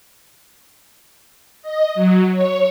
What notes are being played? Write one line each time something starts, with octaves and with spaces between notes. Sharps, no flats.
D#5
F#3
C#5